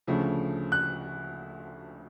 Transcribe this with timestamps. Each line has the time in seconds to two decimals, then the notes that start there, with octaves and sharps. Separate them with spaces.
0.07 D2 C#3 F3 A3
0.72 F#6